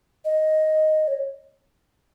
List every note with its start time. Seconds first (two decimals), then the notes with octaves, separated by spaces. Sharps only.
0.25 D#5
1.08 C#5